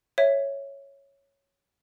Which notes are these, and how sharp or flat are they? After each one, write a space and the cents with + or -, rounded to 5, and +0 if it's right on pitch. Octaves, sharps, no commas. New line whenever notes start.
C#5 +0 E5 +0